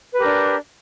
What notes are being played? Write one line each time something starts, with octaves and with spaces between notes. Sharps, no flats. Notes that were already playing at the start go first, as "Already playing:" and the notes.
D4 G4 A#4 B4